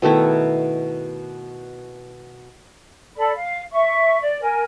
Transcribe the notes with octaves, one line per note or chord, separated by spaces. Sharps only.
B2 D#3 A3 E4
A4 D5 B5
F5
E5 C#6
D5
A#4 G#5